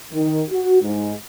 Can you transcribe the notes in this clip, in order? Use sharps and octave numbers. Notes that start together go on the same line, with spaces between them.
D#3
F#4
G#2